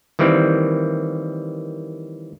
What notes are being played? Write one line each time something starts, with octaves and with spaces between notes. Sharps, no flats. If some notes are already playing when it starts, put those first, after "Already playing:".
D#3 E3 G3 A#3 C4